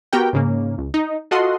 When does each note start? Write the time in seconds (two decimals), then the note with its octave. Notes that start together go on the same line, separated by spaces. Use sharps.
0.13 B3 F#4 G4 A#4 G5
0.33 G#2 C#3 A#3
0.78 C#2
0.94 D#4
1.31 F4 F#4 A4 D#5 F#5 C6